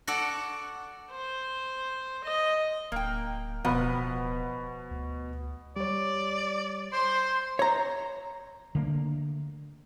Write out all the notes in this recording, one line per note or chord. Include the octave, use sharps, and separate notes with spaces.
F#4 A4 D5 F#5
C5
D#5
D1 A#3 G5
D1 B2 F3 B3 B5
D2
G3 C#5 D5
C5 C6
C#5 A#5
D3 A3 A#3